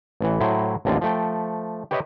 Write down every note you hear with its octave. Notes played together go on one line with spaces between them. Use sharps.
A1 E3
A2 F#3 E4 C5
A1 D#2 D3 C4 F4
F3 A3 G5
G4 B4 C#5 D#5 E5 G5